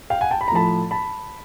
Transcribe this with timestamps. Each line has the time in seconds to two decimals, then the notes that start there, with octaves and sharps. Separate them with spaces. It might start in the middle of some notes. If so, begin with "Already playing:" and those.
0.10 F5 G5
0.21 F#5 G#5
0.31 G5 A5
0.41 B5
0.48 A#5
0.52 A2 F3 A3 A5 B5
0.91 A5 B5